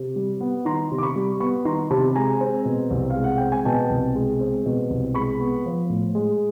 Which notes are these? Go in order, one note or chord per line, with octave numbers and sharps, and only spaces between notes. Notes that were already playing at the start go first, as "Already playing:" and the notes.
Already playing: C3
G3
B3
D#3 A#5 C6
C3
D6
B5 C#6
G3
B3 B5 C#6
D#3 A#5 C6
C3 A5 B5
G#3 G#5 A#5
C4
B2
C2
F5
G#3
F#5
C4 G5
G#5
B2 G5 A5
C2
G#3
C4
B2
C2
G#3 B5 C#6
B3
F3
A2
G#3